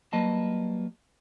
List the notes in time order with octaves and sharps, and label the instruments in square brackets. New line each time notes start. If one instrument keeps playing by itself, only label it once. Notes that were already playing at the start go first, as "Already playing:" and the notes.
[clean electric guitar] F#3 G3 A#3 B4 D#5 A5